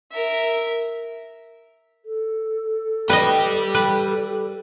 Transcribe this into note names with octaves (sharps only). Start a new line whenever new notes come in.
A#4 E5
A4
G4 B4 D5 D#5 G5
B4